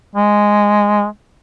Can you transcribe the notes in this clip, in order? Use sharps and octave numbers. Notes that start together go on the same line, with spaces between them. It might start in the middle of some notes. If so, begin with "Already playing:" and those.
G#3